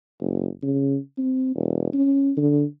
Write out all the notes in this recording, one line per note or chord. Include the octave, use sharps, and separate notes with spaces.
F#1
C#3
C4
E1
C#4
D3